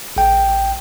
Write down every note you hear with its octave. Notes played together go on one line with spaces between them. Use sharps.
A#1 G5